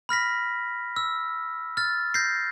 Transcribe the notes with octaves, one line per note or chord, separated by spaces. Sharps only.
B5 F6 A#6 B6
E6
F6 A6
G6 A#6 C7